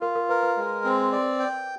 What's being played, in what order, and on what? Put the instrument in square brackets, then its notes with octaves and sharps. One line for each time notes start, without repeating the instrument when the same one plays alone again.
[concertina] F4 [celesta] A#4
[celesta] A#4
[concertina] A#4 [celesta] B4
[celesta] B4
[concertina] G#3
C4
D5
G5